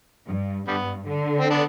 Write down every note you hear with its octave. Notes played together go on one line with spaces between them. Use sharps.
G2
G2 D3 G3 B3
D3
C4
B3 D4